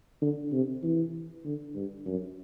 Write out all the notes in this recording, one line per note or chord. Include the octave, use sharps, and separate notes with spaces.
D3
C3
E3
D3
G2
F#2